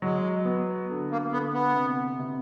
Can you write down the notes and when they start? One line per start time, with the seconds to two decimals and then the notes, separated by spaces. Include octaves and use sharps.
0.02 F#3 G#3
0.45 B3
0.90 D3
1.11 A#3
1.32 D3 B3
1.54 B3
1.75 C3
2.19 C3